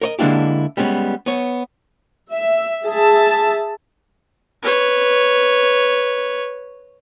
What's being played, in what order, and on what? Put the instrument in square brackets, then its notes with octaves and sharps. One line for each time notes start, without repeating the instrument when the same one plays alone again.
[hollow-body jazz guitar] A#4 C#5 D#5
D3 G#3 A#3 D4 E4 G4
G3 G#3 B3 C#4
B3 C#5
[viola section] E5
G#4 E5 A5
[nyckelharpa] B4 C#5